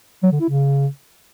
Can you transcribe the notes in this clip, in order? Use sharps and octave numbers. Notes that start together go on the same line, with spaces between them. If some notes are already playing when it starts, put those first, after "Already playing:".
F#3
D3
E4
C#3